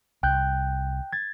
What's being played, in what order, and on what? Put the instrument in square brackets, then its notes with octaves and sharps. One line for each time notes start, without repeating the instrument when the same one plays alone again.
[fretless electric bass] C2 [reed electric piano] G5 F#6 G6
[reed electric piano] G#6 A6